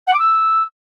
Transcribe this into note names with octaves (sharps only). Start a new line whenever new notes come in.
F#5
D6
E6